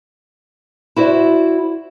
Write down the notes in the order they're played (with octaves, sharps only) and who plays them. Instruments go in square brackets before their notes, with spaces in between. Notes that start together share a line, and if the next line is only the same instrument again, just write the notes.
[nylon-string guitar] E4 F#4 C5 D5